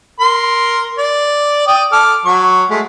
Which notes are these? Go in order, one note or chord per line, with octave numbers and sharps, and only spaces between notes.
A#4 C6
D5
D5 G5 D#6
A4 D6 F6
F#3 C#6
G#3 A3